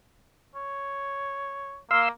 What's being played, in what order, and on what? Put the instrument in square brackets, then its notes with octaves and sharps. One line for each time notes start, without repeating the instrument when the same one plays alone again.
[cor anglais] C#5
[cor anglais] A#3 [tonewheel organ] F5 C6 E6